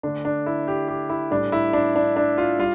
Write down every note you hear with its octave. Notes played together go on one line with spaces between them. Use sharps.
D3 A3 D4
D4
E4
G4
G4
E4
A2 G3 D4
E4
D4
D4
D4
F4
G3 F4